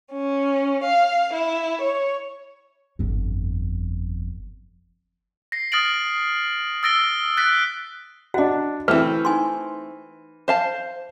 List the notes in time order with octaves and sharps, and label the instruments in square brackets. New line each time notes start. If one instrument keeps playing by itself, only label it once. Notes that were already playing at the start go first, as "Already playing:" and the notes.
[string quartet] C#4
F5
E4
C#5
[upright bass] G1 F2
[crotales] A#6 C7
D#6 F6 A6 A#6 D7 F#7
D#6 E6 A6 A#6 D7 G7
F#6 A6 B6 D7
[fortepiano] D4 F#5 [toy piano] F#4 D#5
[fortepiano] E3 F6 [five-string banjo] A3 C4 [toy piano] B4
[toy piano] D#4 G#5 C6
[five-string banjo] C5 F5 A5